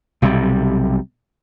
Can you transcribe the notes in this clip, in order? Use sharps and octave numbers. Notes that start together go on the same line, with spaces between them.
B1 C3 F#3 G3